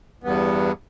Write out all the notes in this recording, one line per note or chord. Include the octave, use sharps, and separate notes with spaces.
E2 G2 B3